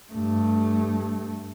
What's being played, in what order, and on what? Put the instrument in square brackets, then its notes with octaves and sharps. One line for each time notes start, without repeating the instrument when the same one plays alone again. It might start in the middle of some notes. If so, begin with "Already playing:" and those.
[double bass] G2 A3